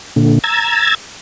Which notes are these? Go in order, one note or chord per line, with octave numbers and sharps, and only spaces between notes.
A#2 D3
A#5 E6 G#6 A6